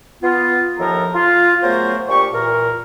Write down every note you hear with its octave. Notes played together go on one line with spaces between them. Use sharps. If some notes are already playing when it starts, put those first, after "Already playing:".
B3 F4
D#2 A2 F3 A4 A#4 A#5
F4
C#3 F#3 A3 B3 A#4 C5
A#2 D4 G4 G5 C#6
E2 A#2 A#4